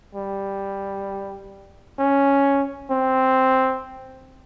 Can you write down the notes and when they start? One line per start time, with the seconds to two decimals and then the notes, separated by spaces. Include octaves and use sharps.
0.15 G3
1.99 C#4
2.90 C4